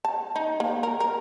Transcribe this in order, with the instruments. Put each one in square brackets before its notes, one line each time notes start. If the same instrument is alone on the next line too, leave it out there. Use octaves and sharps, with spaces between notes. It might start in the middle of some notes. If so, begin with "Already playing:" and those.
[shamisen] A5
D#4
A#3
A#4
A#4